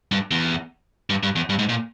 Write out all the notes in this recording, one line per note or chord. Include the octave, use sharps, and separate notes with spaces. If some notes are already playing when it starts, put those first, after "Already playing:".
G2
E2
G2
G2
E2
G2
G#2
A#2